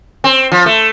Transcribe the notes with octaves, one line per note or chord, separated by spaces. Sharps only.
C4
F3
A3